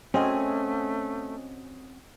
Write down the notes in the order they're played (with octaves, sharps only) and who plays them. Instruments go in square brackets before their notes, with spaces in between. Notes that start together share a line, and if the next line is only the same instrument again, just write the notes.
[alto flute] A3 [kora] C4 [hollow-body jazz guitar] C#4 G#4 [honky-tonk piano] F#4 D#5 G#5